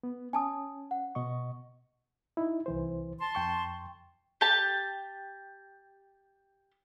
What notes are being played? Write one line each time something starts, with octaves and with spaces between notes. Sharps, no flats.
B3
C#4 G#5 A5 D#6
F#5
B2 D#5 C#6
D#4 E4
C2 E3 C5
A5 C6
F2 G5 C#6
G4 A5